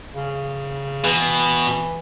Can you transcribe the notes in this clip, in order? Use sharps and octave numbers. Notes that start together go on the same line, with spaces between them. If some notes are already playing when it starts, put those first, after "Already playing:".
C#3
B2 E3